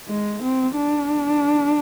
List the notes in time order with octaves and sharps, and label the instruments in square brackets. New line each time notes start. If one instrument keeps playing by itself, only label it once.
[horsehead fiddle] G#3
C4
D4